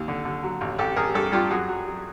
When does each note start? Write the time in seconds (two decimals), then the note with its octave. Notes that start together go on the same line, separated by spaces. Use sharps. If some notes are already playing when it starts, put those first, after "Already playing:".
Already playing: D#2
0.08 D3
0.25 D3
0.43 F#3
0.61 A1
0.79 A1 G4 A4
0.96 A1 G#4 A#4
1.14 G2 G4 A4
1.32 G2 F4 G4
1.51 F#2 F#4 G#4
1.68 F#3
1.87 F#3